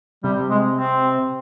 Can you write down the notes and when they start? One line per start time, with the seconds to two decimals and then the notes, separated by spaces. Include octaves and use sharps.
0.24 C3 G3
0.50 G#3
0.77 C4